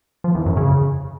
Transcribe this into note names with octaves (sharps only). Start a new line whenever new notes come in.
F3
E2
F#2
C#3